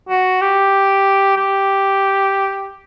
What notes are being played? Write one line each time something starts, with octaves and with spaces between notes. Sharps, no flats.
F#4
G4
G4